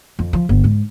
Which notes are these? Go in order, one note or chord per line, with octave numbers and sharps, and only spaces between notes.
F2
F3
G1
G#2